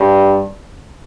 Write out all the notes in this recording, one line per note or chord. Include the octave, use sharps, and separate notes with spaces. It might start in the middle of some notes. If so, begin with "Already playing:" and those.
Already playing: G2